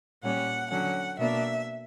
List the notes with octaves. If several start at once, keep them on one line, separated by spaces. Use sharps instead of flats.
A#2 G3 C#4 F#5
D3 F#3 C#4 F#5
B2 A#3 D4 E5